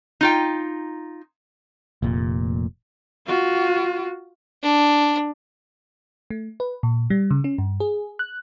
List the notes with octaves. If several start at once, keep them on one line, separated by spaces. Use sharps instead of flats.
D#4 F4 G5
F1 A#2
F4 F#4
D4
A3
B4
A#2
G3
C#3
C#4
G2
G#4
F#6